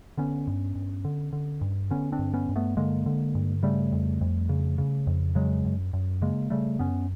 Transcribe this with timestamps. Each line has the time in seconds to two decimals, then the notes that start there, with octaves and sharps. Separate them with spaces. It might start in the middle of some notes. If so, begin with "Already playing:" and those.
0.17 D3 B3 C#4
0.47 G2
0.75 G2
1.05 D3
1.33 D3
1.61 G2
1.90 D3 B3 C#4
2.12 C4 D4
2.19 G2
2.34 B3 C#4
2.49 G2
2.56 A3 B3
2.77 D3 G#3 A#3
3.06 D3
3.35 G2
3.63 C#3 G3 A3
3.92 F2
4.21 F2
4.49 C#3
4.78 C#3
5.07 F2
5.35 C#3 F#3 G#3
5.65 F#2
5.93 F#2
6.22 C#3 G#3 A#3
6.50 C#3 G3 A3
6.79 F#2 B3 C#4